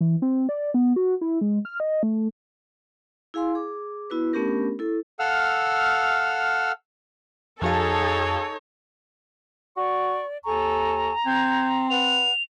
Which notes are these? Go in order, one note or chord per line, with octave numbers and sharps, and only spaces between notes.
E3
C4
D5
B3
F#4
E4
G#3
F6
D#5
A3
E4 G#4 F5 G#5 C6
G#4 D6
B3 E4 F#4 B4
A3 B3 C#4 D4 G4 A#4
E4 A4
A4 F5 F#5 E6 F6
F2 D#4 F#4 G#4 A4 C#5 F5
F#4 D5 C#6
D#2 A4 G#5 A#5 C#6
C4 G6 G#6
B4 F#5 F7